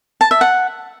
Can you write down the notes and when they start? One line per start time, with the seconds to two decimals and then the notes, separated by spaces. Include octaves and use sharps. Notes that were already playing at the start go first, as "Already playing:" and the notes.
0.21 A5
0.31 E5
0.41 F#5